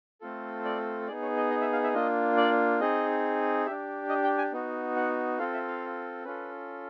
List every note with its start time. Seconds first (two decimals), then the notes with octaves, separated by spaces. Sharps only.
0.21 A3 C4 F4 A4
0.65 D5
1.08 B3 D#4 G#4 D5
1.22 C#5
1.36 D#5
1.50 D#5
1.61 E5
1.73 F5
1.84 E5
1.94 A#3 D4 F4 D#5
2.37 D5
2.80 C4 D#4 G#4 D#5
3.66 G4 E5
3.70 D4
4.09 D#5
4.24 G5
4.38 G#5
4.53 B3 D#4 F#4
4.96 F#5
5.39 C4 F4 A4 F5
5.54 E5
5.68 F5
6.25 C#4 F4 A4 B4